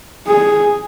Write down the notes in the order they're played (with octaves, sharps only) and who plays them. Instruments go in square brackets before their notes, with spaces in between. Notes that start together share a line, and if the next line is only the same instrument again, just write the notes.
[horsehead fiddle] G#4